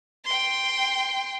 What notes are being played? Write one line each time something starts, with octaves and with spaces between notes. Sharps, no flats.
G5 C6